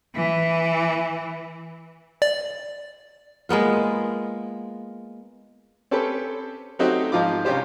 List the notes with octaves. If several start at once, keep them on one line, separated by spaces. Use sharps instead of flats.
E3
D5
G#3 A#3 B3 F4
C4 C#4 G4 A4 B4
F#3 A3 C4 D#4 F#4 G4
G#2 F3 F4 D6
C2 C#4 F4 G4 C5